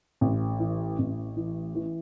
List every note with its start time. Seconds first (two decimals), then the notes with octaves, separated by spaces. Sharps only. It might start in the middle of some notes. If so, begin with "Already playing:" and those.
0.21 A1
0.60 E3
0.99 A1
1.37 E3
1.75 E3